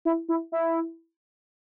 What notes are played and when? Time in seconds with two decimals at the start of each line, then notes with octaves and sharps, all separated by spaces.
0.05 E4
0.29 E4
0.52 E4